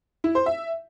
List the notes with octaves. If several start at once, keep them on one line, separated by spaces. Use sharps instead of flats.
E4
C5
E5